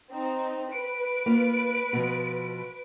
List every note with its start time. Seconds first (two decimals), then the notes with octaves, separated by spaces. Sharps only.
0.10 C4 D#4
0.70 B4 D7
1.26 A#3 F4
1.93 B2 F3